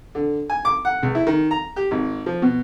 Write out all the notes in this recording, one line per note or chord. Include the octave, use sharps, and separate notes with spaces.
D3
G#5
D6
F#5
C#2
E4
D#3
A#5
G4
G#1
F3
B2